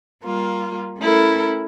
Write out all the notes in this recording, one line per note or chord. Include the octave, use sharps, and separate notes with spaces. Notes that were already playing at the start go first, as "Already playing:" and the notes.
G3 A#3 F4
A3 C#4 E4 A4 A#4